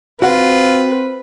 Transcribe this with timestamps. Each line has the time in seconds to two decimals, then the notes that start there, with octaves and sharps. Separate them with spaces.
0.22 C4 F4 F#4 B4 F#5